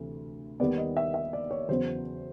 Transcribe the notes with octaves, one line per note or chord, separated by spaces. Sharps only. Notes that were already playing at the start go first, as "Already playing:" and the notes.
Already playing: D2 C3 E3
D#2 D#3 G3 B3 D5
D#5
E5
E5
D5
C#5
E2 C#3 F#3 B3 C5